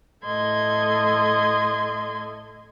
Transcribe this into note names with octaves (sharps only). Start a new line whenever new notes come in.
A2 A4 D#5 C6 G#6